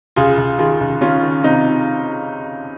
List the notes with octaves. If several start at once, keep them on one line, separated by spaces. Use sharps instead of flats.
C#2 F4 G#4
C#2
D#3 F4 G#4
C#2
D#3 C#4 F4
D#3
C3 D#4